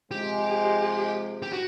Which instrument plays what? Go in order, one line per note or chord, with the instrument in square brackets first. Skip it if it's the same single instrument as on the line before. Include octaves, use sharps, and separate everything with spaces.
[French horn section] C3 F3 G#3 [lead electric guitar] G4
[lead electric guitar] G4
F#4